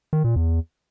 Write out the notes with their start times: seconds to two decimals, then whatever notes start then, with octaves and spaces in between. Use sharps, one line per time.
0.13 D#3
0.24 A#2
0.36 E2